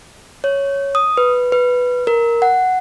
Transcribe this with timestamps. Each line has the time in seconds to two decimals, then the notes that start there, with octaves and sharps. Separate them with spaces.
0.44 C#5
0.95 D#6
1.17 B4
1.52 B4
2.07 A#4
2.42 F#5